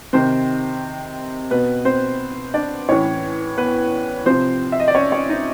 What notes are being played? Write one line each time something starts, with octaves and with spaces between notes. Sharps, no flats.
C3 D#3 C4 C5
B2 B3 B4
C4 C5
D4 D5
A2 E3 C#4 C#5
B3 B4
C3 F3 C4 C5
E5
D#5
D5
C#4 C#5
C#4 C#5
D#4 D#5